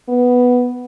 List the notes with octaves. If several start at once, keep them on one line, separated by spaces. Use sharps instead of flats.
B3